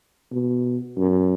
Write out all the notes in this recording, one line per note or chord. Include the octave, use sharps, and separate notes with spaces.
B2
F#2